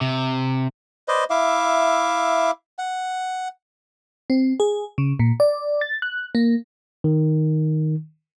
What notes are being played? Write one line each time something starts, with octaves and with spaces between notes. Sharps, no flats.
C3
B4 C5 D5 D#5
E4 E5 F5 D6
F#5
C4
G#4
C#3
A#2
D5
A6
F#6
A#3
D#3